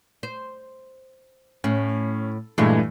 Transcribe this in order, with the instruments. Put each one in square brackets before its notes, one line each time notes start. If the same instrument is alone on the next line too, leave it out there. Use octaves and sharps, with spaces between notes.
[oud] C5
[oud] A2 [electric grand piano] C#4
[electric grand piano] G2 E3 A3 [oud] A#2 G#3